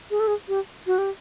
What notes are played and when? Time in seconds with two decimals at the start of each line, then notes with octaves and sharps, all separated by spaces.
0.11 G#4
0.20 A4
0.27 G#4
0.48 G4
0.87 F#4
0.98 G4